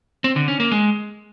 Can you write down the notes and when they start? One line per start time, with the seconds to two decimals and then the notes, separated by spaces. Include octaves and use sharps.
0.24 C4
0.36 D3
0.48 C#4
0.60 A#3
0.72 G#3